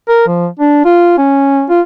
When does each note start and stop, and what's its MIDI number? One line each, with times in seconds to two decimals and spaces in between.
0.09 0.27 70
0.28 0.47 53
0.60 0.81 62
0.85 1.13 65
1.18 1.64 61
1.70 1.81 65